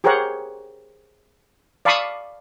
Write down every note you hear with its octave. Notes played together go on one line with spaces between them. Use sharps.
G4 G#4 A#4 C5 C#5 F#5
D5 F5 A5 B5 C#6 D#6